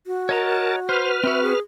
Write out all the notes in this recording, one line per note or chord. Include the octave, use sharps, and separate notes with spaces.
F#4
A#4 C#5 D#5 A5 A#5
B4 C5 F6
C4 F#4 E5
G#4